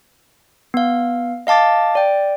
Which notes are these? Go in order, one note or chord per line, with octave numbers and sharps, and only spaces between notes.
B3 F5
D#5 F5 A5 D6 A6
D5 G5